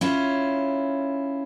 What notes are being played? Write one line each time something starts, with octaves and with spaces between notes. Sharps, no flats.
C#4 E4 F4